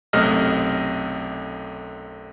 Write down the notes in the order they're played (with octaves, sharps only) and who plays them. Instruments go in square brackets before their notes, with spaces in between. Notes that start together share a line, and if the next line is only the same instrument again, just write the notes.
[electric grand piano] B1 F#2 C3 A3 D#5 F6